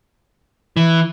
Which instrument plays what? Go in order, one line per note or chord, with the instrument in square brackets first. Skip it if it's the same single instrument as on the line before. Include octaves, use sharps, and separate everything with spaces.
[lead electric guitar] E3